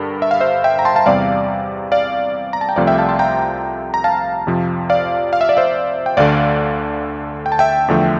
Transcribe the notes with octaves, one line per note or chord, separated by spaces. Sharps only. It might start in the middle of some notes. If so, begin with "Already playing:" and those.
Already playing: G2 D3 G3 A#4
E5
F5
C5 E5
E5 G5
A#5
A5 C6
F5 A5
E2 C3 G3 D5 F5
D5 F5
A#5
A5
G5
C2 C3 F3 A3 D5 F5
E5 G5
F5 A5
A5 C6
G5 A#5
A#5
F5 A5
F2 C3 F3
D5 F5
F5
E5
D5
C5 E5
G5
D2 D3 A3 D5 F5
G5
A5
E5 G5
E2 D3 F3 A3